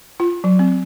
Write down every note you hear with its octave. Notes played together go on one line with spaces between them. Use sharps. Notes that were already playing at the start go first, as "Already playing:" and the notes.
F4
F#3
C4